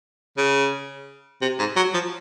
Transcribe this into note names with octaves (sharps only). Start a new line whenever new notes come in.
C#3
C3
G#2
F#3
F3